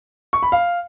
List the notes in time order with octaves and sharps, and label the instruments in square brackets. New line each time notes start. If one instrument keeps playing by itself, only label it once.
[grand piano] C#6
B5
F5